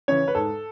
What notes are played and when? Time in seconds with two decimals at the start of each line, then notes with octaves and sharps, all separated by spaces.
0.08 C#3 E3 C#5
0.28 B4
0.35 G#2 A4